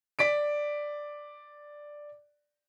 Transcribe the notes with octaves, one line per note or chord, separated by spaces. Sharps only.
D5 B6 D7